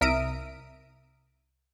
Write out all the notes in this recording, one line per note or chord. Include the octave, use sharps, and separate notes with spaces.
C2 A#4 E5 D#6 D7